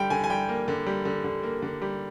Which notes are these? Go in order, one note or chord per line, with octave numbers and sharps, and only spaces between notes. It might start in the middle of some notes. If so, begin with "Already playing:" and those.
Already playing: D3 G3 G5
D3 G#5
G#5
G3 G5
A#3
D3
G3
D3
D3
A#3
D3
G3